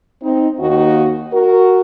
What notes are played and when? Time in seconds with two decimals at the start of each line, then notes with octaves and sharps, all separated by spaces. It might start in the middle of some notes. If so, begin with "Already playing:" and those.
0.22 C4 D#4
0.60 D#2 D#3 A#3 D#4 F#4
1.33 F#4 A#4